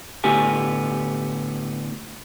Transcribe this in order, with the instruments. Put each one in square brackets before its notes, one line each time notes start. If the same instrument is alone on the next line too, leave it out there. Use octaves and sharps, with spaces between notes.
[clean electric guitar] A2 D3 B3 G4 G#5